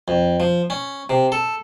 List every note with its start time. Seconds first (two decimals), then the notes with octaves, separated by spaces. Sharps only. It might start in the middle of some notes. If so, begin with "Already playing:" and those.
0.08 F2
0.40 F3
0.70 C#4
1.10 C3
1.32 A4